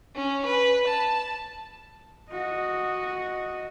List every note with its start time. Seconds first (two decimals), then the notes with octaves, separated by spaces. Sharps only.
0.15 C#4
0.46 B4
0.88 A5
2.31 F#4 D#5